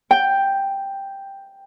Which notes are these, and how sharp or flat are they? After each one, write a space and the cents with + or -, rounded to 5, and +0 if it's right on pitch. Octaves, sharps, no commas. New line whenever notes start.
G5 +5